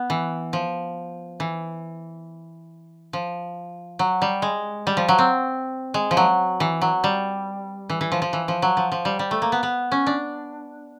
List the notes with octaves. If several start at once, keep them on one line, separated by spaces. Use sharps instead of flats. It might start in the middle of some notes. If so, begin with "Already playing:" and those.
Already playing: B3
E3
F3
E3
F3
F#3
G3
G#3
G3
F3
F#3
C4
G#3
F3
F#3
E3
F#3
G3
E3
E3
F3
F3
E3
F3
F#3
F3
F3
G3
G3
A3
A#3
B3
B3
C#4
D4